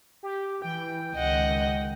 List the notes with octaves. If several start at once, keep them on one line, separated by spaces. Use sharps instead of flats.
G4
E3 G5
C#2 D#3 D#5 F#5